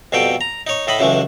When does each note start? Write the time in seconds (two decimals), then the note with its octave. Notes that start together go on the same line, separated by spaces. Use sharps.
0.12 F2 B2 G3 A4 G5
0.41 A#5
0.67 D#4 C#5
0.87 A2 A4 D#5 B5
0.99 C#2 F#2 E3 G#3 A3